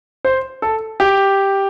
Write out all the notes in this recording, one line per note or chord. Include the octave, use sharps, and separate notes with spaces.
C5
A4
G4